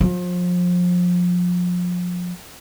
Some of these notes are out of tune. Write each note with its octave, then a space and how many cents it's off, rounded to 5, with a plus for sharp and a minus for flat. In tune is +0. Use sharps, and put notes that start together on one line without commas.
F3 +30